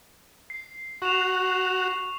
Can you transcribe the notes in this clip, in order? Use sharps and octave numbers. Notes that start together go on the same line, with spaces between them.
C7
F#4 C#6 E7 F7